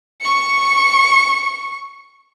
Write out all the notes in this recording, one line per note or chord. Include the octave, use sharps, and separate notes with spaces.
C#6 C#7